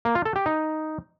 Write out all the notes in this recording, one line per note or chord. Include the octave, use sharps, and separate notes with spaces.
A#3
F4
A4
G4
D#4